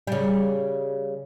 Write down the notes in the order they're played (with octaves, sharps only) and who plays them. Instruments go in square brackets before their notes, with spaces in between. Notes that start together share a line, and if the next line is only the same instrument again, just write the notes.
[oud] C#3 G3